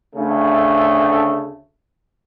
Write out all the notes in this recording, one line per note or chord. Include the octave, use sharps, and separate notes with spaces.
D2 C#3 A3